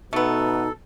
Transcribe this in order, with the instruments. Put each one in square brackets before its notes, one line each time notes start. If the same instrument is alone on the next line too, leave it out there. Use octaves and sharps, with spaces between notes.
[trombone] B2 [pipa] A3 B3 [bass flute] D#4 [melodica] A4